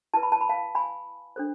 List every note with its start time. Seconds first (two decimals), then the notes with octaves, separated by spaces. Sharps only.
0.14 E4 B4 A5
0.23 B5
0.32 A5
0.41 B5
0.49 F5 A5
0.75 G#5 B5
1.36 D4 A4 C5